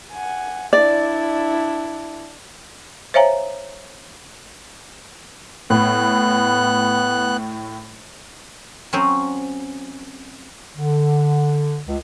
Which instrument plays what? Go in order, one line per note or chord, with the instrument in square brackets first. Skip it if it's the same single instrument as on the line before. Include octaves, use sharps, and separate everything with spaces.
[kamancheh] F#5 G#5
[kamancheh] D4 E4 [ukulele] D5
[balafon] C5 C#5 E5 F5 G#5 A#5
[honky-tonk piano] A2 [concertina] B3 F#6
[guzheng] F#3 C4 C#4 F#4 C5
[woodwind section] D3
C#2